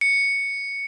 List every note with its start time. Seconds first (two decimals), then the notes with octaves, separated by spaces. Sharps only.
0.01 C#7